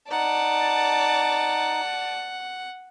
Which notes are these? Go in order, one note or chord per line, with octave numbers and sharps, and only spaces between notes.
D#4 D5 F#5 A5